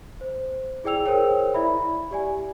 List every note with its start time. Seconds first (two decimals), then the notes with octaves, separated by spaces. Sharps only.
0.21 C5
0.84 E4 G#4 D5 G5 E6 F7
1.06 G#4 A#4 C5 C#5 G5
1.54 E4 D5 E5 B5
2.11 G4 D5 G#5